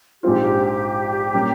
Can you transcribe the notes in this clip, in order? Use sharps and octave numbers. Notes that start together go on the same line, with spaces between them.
A#1 G#2 F3 C4 F4 G4
A#2 G3 A#3 C#4